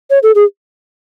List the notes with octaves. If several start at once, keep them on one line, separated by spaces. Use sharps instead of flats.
C#5
A4
G#4